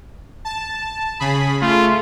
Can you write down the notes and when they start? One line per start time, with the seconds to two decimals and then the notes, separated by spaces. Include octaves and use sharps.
0.45 A5
1.20 C#3 G#4 B5
1.62 A3 F4